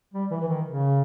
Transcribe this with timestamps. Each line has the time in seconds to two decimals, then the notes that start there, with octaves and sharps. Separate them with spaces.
0.14 G3
0.31 E3
0.41 E3
0.49 D#3
0.66 C#3